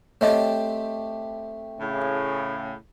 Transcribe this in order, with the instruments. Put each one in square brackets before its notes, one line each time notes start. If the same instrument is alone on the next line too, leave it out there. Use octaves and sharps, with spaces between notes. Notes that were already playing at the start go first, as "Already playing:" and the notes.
[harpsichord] A3 C4 G4 [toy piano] C#5 D#5
[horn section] A2 C#3